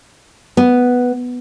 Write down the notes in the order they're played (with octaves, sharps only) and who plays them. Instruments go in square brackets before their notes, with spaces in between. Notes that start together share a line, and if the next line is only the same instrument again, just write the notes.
[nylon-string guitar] B3